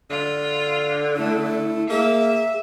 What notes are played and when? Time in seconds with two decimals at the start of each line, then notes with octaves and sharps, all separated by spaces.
0.10 D3 F4
1.16 A3 E4
1.90 A#3 G#4 E5